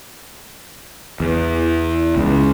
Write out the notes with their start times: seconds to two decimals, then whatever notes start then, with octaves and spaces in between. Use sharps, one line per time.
1.20 E2
2.16 C#2